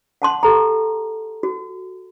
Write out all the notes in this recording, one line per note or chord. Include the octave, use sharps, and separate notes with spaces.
F#5 A5 C6
G4 A4 A#5
F#4